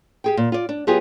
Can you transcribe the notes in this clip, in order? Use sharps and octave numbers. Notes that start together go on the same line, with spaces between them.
G4 G#4 G5
A#2
F4 D5
D4
F#3 B3 F4 G4 G#4